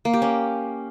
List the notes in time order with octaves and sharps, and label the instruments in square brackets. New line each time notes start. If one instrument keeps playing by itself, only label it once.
[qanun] A#3
G4
C#4